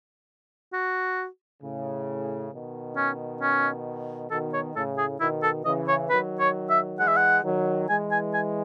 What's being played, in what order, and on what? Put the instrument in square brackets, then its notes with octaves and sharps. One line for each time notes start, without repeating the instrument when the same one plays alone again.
[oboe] F#4
[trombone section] A2 C#3
B2 D#3
[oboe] C#4
C#4
[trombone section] B2 D#3 [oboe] A4
[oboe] C#5
[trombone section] A2 C#3 [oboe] A4
[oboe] G#4
[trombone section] B2 D#3 [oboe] E4
[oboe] A4
[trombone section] C#3 E3 [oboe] D#5
[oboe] C#5
[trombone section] D#3 F#3 [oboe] B4
[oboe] C#5
E5
[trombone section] E3 G#3 [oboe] F#5
[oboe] E5
F#5
[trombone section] D#3 F#3
[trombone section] E3 G#3 [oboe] G#5
[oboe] G#5
G#5